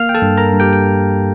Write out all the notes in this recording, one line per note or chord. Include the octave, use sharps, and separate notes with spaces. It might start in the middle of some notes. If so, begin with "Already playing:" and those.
Already playing: A#3 F5 F6
G5
A4 A5
G2
A#4 A#5
G2
G4 G5
G5